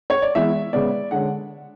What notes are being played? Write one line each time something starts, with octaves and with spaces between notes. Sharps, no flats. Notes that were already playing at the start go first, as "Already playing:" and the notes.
C#5
D5
E3 G#3 B3 E5
C#3 G#3 B3 D5
D3 G#3 C#4 F#5